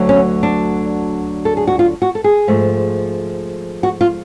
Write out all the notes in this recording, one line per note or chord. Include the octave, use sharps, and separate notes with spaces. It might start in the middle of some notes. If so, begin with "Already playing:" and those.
Already playing: D2 D3 F#3 A3
C#4
D4
A4
G#4
F#4
F4
F#4
A4
G#4
G#2 F3 A3
F#4
F4